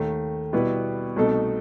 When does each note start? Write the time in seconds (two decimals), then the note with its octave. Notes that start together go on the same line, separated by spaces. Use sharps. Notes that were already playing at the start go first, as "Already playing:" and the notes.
Already playing: D#2 D#3 A3
0.53 B2 G3 B3 E4 B4
1.16 C2 B2 A3 D#4 A4